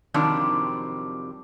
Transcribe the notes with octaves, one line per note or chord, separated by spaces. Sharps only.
F2 C3 D#3 F#3 G3 D4